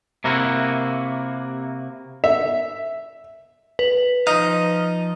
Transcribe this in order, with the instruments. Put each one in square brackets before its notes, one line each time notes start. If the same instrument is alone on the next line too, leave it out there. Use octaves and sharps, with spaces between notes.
[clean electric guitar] C3 A#3 E4 F#4
[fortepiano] E5
[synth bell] B4
[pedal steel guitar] F3 D#5 F5 [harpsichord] D#4